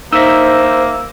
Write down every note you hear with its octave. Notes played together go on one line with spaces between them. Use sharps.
A#3 D#4 C5 E5 E6